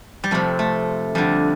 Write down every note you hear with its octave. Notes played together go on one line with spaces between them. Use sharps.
G3
F2 C3 A3
A3
F2 D3 G3